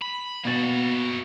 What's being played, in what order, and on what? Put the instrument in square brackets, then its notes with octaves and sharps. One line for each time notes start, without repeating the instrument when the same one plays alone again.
[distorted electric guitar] B5
[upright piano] B2 A6 [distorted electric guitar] A#3 F#4